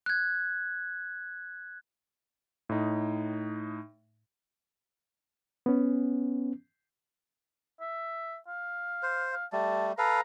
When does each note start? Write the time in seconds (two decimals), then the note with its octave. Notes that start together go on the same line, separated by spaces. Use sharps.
0.06 F#6 G#6
2.69 A2 D#4
5.66 B3 C#4
7.80 E5
8.47 F5
9.03 C5
9.33 F5
9.53 G3 A3 A5
9.98 A4 B4 F5 A#5